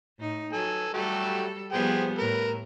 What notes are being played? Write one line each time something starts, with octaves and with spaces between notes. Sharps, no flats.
A2 D#4
F#3 A4 G#5
F#3 G3 A3 G4 A4
F3 G3 B3 G#4 C5 G5
A2 A#4 B4